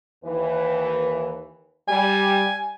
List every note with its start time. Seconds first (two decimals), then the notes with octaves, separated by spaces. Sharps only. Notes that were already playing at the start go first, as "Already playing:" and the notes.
0.24 D#2 E3 B4
1.88 G3 G#5